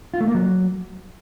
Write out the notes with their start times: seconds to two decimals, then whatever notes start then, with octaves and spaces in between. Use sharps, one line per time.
0.14 F4
0.20 A3
0.27 A#3
0.34 F#3